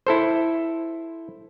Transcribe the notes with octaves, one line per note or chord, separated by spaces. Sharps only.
E4 A4 C5